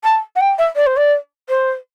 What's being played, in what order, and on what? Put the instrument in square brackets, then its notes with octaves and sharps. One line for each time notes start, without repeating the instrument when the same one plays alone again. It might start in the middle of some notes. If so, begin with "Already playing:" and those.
[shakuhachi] A5
F#5
G5
E5
D5
C5
D5
C5